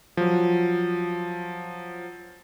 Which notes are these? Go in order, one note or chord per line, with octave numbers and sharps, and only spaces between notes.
F3 F#3